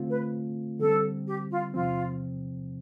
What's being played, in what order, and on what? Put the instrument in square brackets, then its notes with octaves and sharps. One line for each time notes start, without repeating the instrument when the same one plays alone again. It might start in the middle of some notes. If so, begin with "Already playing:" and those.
Already playing: [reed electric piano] D3 A3 C4 F4
[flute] B4
[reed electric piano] D3 G3 C4 [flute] A4
[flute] G4
F4
[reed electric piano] E2 C3 F3 C4 [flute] F4